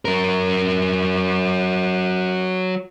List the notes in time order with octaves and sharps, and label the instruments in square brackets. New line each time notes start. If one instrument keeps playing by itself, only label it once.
[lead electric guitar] F#3 A#4